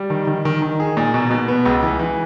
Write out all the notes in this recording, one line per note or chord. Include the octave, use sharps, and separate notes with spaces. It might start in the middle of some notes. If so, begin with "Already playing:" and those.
Already playing: G3
D#3
D#3
D#3
D#3
G#4
A#2
B2
B2
B3
C#2
E3
E3